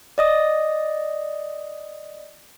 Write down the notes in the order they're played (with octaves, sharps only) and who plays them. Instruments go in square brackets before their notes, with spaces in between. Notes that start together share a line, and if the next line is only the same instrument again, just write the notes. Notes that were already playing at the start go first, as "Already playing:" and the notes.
[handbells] D5 D#5 D#6